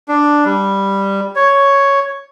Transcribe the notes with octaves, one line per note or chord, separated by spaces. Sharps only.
D4
G3
C#5